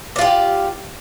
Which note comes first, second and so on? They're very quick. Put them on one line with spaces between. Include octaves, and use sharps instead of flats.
D5 F4 G4